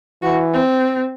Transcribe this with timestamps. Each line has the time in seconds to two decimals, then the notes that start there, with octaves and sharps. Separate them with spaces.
0.22 E3 F#4
0.53 C4